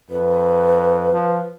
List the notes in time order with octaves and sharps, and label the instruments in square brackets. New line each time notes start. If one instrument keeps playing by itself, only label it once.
[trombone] F2 [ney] B4
[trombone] F3